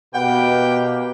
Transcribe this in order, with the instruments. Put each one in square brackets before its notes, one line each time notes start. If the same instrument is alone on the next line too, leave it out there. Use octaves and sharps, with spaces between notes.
[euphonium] B2 [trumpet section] A#3 G4 B4 [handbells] F#5 [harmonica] G5